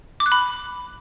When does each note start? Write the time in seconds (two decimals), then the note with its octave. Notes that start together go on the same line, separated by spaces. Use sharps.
0.20 D6
0.26 F#6
0.32 B5